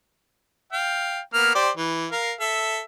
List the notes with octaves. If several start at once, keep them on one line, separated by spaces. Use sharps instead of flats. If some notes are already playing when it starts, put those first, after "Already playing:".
F5 G5
A#3 B3 F6
G4 C5 D5
E3
A#4 F5
A4 E5